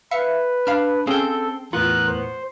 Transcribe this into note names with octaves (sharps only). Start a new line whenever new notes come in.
B4 E5 F5 C#7
D4 F5 B5 F6
C4 C#4 G#4 A4 F5 G5
E2 A2 B3 F4 A#4 F#6
C5